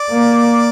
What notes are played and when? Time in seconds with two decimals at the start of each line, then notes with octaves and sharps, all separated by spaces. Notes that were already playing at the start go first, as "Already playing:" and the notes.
Already playing: D5
0.11 A#3